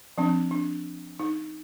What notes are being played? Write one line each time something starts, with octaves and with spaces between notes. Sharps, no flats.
F3 C4 D4
D4
D#4